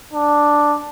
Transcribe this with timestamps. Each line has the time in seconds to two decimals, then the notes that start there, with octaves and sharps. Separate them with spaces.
0.13 D4